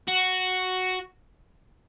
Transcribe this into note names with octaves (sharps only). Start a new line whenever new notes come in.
F#4